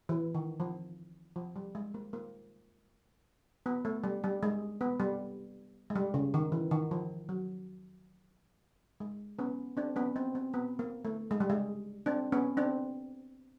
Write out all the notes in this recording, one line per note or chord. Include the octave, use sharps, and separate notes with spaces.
E3
D#3
F3
F3
G3
G#3
A#3
A#3
B3
A3
G3
G3
G#3
B3
G3
G#3
G3
C#3
D#3
E3
D#3
F3
F#3
G#3
B3 C#4
C4 D4
B3 C#4
C4
C4
B3
A#3
A3
G#3
G3
G#3
C4 D4
B3 C#4
C4 D4